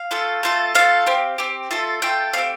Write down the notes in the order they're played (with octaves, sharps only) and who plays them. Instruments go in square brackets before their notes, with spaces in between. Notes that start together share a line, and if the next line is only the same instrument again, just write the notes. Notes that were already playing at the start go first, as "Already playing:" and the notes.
Already playing: [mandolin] F5
A3 F4 A4
A3 F4 A4
A3 F4 A4 F5
C4 G4
C4 G4
A3 F4 A4
A3 F4 A4 G5
A3 C4 G4 F5